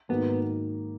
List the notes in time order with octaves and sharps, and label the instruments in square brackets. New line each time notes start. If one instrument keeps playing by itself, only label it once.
[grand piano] G#2 D#3 A#3 D#4 F#4 [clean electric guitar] B3